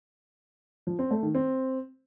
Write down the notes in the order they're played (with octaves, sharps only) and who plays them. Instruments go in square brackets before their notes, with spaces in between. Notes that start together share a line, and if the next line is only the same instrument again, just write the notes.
[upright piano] F3
C4
A3
D#3
C4